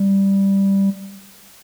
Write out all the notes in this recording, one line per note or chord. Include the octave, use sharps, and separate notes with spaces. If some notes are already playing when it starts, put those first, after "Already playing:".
Already playing: G3